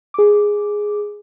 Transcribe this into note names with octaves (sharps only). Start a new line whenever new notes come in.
G#4 D6